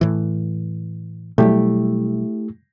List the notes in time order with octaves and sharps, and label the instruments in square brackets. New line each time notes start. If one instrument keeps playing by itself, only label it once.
[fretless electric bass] A2 E3
[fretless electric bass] B2 F#3 G3 [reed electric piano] A3 E4 G4